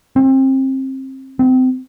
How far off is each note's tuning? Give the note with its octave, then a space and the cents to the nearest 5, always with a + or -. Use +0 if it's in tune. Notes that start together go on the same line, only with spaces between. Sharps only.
C4 +30
C4 -30